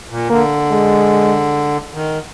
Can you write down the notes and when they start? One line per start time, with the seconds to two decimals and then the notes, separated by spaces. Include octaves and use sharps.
0.10 A#2
0.30 D3 A#3
0.71 G#3
1.94 D#3